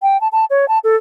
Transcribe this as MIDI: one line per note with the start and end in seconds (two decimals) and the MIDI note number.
0.02 0.20 79
0.21 0.28 81
0.32 0.45 81
0.50 0.68 73
0.68 0.79 81
0.84 0.96 69